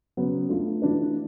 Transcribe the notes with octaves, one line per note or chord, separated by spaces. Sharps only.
C#3 F#3 B3
A3 D4 F4
E3 A3 D4 F#4 B4